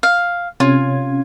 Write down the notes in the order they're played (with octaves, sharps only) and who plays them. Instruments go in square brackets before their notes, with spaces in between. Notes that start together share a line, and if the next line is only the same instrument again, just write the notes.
[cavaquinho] F5
[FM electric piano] C3 C#4 G#6 [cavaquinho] F4